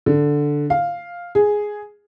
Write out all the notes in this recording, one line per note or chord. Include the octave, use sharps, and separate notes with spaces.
D3
F5
G#4